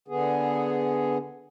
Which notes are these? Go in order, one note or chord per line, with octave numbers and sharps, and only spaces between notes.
D3 B3 G#4